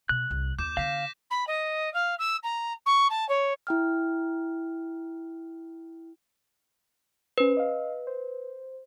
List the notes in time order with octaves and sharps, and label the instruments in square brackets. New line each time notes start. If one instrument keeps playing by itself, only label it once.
[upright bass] B2 [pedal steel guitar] F#6
[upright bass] C2
[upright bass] D#2 [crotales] D6 G6 E7
[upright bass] D3 B3 [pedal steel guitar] F5 [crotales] A#6 B6 E7
[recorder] B5
D#5
F5
E6
A#5
C#6
A5
C#5
[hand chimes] E4 G5 F6
[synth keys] C#4 C5 [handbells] B4
[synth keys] D#5 F5
C5